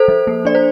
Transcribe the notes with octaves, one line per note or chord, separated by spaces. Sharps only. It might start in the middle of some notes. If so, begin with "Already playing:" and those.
Already playing: A4 C5
F3
A#3
D4 D5
C5